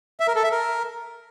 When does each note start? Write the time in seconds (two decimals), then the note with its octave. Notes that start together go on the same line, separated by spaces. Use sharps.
0.20 E5
0.28 A#4
0.36 A4
0.44 E5
0.52 A#4